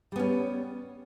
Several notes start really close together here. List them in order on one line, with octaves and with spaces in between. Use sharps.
G3 B3 C#4